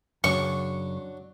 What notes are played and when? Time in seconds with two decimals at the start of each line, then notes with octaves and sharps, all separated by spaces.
0.24 F#2 C#3 F#3 D4 F#4 C#6